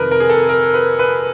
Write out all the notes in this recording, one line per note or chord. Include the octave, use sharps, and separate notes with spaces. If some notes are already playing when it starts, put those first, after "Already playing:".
Already playing: F2 C3 D#3 A#4 B4
A#4
G#4
A4
A#4
B4
B4